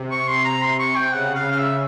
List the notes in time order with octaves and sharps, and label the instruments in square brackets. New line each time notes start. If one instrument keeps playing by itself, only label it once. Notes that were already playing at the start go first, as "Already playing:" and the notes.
Already playing: [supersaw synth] C3
[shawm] C#6
C6
A#5
C6
C#6
G5
[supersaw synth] C#3 [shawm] F#5
[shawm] F5
F5
E5